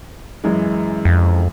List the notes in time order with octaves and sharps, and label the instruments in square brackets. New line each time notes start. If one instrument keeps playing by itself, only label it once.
[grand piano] F#2 E3 G#3
[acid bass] F2